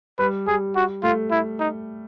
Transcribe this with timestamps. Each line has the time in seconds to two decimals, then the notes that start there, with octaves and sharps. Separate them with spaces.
0.19 G3 B4
0.47 G3 G#4
0.76 F#4
1.03 A3 F4
1.31 E4
1.60 D#4